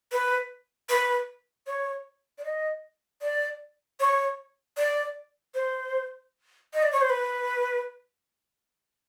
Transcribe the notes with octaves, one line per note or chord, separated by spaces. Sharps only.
B4
B4
C#5
D5
D#5
D5
C#5
D5
C5
D#5
D5
C#5
C5
B4